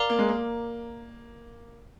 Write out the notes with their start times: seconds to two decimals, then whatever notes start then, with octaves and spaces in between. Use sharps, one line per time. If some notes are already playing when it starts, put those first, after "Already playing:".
Already playing: A#4 D5 F5 A#5 D6
0.09 A#3
0.19 G#3
0.28 A#3